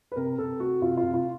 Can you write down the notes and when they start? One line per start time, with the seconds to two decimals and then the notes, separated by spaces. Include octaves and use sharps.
0.12 B4
0.16 C3 A#4
0.38 C3 A4
0.59 A3 F#4
0.82 C3 F4
0.97 F4
1.03 C3
1.14 F4